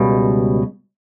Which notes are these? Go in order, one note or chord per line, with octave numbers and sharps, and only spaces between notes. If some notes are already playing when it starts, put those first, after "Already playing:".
Already playing: C#2 B2 G3